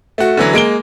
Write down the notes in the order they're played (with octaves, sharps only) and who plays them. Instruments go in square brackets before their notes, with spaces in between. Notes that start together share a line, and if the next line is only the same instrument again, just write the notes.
[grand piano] A3 F#4
D3 E3 F#3
G#3 A#3 D7 G7